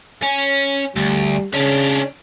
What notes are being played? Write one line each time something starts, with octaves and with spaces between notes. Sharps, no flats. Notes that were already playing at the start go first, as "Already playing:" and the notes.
C#4
D2 G3
C#3 C#4 D4